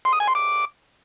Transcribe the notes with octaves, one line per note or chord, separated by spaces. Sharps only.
C6
D#6
G#5
C6
D6